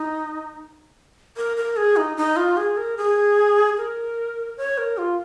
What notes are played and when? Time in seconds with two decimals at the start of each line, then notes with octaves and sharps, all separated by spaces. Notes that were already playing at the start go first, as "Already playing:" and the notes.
Already playing: D#4
1.37 A#4
1.57 A#4
1.77 G#4
1.97 D#4
2.17 D#4
2.36 F4
2.57 G#4
2.77 A#4
2.97 G#4
3.77 A#4
4.57 C#5
4.78 A#4
4.98 F4